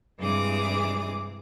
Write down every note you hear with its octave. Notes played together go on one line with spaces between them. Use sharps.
G2 C3 E3 G#3 G#4 D6